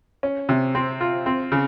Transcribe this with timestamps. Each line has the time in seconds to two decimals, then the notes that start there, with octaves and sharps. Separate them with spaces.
0.23 C#4
0.49 C3
0.75 C4
1.01 F4
1.26 C4
1.52 C#3